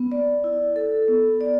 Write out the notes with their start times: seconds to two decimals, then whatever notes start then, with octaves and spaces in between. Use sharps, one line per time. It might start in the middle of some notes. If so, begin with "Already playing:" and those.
Already playing: B3
0.12 D5
0.44 E4
0.76 A4
1.08 B3
1.41 D5